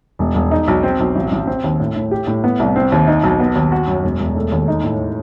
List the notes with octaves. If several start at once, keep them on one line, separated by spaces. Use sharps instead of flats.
E1
E1
D#4
B1
C4
B1
A1
A1
C4
D#2
A2
A2
G4
A2
B3
C2
C4
D#2
D#4
B1
B3
D#2
F#4
F#2
E1
E1
A3
D#2
D#4
A2